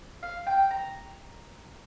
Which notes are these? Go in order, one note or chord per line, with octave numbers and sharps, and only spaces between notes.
F5
G5
A#5